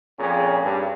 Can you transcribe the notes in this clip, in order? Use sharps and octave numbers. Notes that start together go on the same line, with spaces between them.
F2 A#2 C#4 G#4
G2 G3